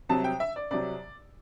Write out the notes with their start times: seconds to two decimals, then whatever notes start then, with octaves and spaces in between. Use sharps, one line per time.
0.09 C2 C3 F#3 A5
0.24 G5
0.40 E5
0.56 D5
0.71 C2 C3 F#3 D5